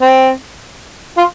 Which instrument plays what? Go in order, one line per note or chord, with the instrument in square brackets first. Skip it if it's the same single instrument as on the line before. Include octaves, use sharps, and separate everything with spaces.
[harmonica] C4
F4